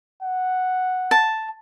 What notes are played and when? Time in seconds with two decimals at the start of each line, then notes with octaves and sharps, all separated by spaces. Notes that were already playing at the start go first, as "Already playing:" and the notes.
0.22 F#5
1.11 A5